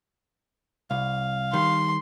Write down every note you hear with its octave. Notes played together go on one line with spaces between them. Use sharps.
C2 F5
D#3 G3 C6